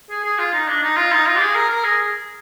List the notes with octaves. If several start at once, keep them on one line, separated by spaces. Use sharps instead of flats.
G#4
G#4
F4
D#4
D4
D#4
F4
D#4
F4
G4
G#4
A#4
A#4
G#4